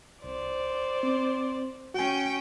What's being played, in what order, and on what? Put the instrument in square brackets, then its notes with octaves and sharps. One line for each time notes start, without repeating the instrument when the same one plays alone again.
[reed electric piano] C2 [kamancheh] C5 D5
[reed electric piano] C4
[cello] C#4 G5 [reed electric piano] F#4 G#5